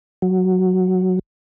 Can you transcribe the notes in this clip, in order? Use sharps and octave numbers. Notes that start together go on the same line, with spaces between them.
F#3